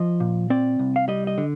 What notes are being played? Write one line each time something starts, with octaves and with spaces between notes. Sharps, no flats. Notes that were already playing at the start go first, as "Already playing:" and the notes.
Already playing: F3 D#5
A#2
C4 D5
C2
F5
G3 D#5
D#5
D3